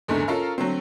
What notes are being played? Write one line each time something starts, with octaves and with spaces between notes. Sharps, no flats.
F#1 E2 G#2 D3 A3
C#4 F4 A4 A#4 F5 A#5
D3 F#3 A3 C4